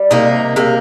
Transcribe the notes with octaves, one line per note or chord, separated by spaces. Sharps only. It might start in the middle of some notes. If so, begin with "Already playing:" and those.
Already playing: G3
C3 A#3 D#4
C3 A#3